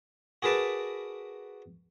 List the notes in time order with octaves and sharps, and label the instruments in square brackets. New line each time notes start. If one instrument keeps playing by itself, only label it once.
[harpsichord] F#4 G#4 A#4 B4 A5 D6